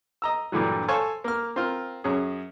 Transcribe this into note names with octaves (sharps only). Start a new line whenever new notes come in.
D#5 A#5 E6
G2 A#2 D3 E3 F#3
A4 C5 C#5 F5 G#5 C#6
A#3 F6
C4 F4 A#4
F#2 C#4 G#4